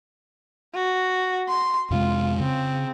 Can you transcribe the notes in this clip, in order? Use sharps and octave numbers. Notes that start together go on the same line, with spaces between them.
F#4
C6
F2 C3 G#3 F4
C#3 C4